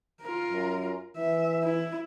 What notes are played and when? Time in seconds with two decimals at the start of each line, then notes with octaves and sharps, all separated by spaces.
0.22 F4 A#4
0.51 F#2
1.17 E3 E5
1.63 E4